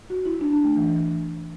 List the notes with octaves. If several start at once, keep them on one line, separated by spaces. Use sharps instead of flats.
F#4
E4
D4
D4
A3
E3
E3